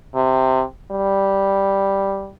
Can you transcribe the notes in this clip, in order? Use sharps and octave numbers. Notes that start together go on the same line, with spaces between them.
C3
G3